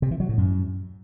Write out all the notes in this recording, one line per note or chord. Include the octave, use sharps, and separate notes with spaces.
C3
E3
F#3
A2
F#2